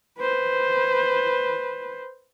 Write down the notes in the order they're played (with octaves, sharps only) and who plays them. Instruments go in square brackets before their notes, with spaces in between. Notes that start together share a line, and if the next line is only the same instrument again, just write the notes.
[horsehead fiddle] B4 C5